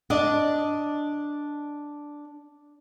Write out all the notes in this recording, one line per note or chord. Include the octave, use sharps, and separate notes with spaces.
D4 D5 D#5